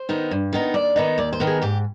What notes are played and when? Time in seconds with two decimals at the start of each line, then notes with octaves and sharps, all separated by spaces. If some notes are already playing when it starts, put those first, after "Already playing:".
Already playing: C5
0.09 D#3 B3 D#4
0.31 G2
0.53 D#3 B3 D#4
0.74 D#2 D5
0.96 D#3 B3 D#4
1.18 D#2 D5
1.33 C5
1.40 D#3 B3 D#4
1.47 G#4
1.62 G#2 G4